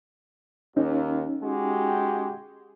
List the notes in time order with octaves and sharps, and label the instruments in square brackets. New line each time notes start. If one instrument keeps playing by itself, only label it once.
[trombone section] D#2 [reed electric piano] C#4 D#4
[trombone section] G#3 F#4 G4